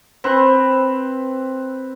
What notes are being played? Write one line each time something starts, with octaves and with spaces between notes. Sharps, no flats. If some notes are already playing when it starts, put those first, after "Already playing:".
C4 B4